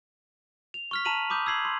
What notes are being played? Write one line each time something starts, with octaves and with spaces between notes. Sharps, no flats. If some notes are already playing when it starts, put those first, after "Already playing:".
F7
C#6 F6 B6
A5 A#5 B6 D#7 F7 F#7
B5 D6 D#6 G6
E6 G#6 C7 F#7
C6